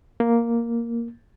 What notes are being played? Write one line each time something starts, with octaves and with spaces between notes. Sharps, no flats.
A#3